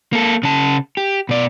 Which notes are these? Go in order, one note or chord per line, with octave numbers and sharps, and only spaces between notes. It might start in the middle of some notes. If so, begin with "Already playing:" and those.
A#3 A4
C#3 A5
G4
B2 D5